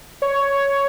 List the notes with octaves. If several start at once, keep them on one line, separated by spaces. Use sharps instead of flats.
C#5